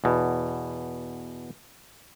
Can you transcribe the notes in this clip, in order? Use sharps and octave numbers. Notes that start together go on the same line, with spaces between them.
E2 B2